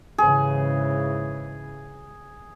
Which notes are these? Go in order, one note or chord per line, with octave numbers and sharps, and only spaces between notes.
G#2 C#3 E3 G#4